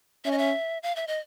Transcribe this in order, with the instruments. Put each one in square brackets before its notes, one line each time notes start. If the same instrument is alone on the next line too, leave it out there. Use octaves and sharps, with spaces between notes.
[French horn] C#4 [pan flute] E5
[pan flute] D#5
E5
F5
E5
D#5